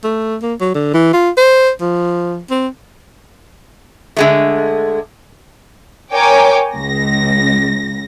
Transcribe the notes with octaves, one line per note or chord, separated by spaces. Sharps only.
A3
A#3
F#3
D3
E3
F4
C5
F3
C4
D3 G#3 A3
A#4 C#5 G5 G#5 D6
C#2 A#6